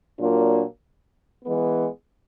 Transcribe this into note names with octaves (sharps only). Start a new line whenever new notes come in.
A#2 F#3 A#3 D4 F4
E3 G#3 B3